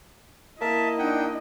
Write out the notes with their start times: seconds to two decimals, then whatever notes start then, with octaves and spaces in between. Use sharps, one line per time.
0.61 A#3 E4 D#5 E5 A5
0.99 D4 D#4 F#5 G5